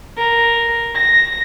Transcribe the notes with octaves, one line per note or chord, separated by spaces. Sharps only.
A#4
A#6